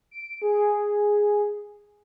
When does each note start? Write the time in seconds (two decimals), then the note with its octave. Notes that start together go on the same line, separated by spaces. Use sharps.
0.11 D7
0.42 G#4